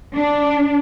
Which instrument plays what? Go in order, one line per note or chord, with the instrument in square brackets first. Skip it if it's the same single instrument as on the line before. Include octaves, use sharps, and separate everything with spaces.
[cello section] D4